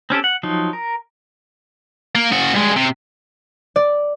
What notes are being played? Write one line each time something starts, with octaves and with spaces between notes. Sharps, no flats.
C4 C#4 G4 A4
F#5
F3 F#3 D#4
A#4
A#3
C#3 F#4
G2 G#3
C3
D5